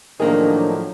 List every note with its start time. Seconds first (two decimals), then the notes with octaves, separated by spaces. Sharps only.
0.20 A2 D#3 F3 F#3 A#3 D4 G#4